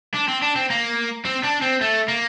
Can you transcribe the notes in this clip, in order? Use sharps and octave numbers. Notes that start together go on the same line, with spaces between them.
D4
C4
D4
C4
A#3
C4
D4
C4
A3
A#3